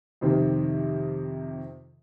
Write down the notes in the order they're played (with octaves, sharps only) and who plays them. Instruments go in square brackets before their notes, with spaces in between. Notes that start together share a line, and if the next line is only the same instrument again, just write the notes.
[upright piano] F2 C3 D#3 C4